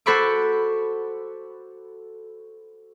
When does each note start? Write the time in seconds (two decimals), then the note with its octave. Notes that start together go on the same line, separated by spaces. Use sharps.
0.06 F#4 A4 C5 B5 C#6 D6